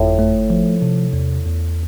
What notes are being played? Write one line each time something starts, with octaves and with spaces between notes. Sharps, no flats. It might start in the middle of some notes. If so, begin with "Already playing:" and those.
Already playing: G1 F2 A2
A3
F3
C3
E2
E2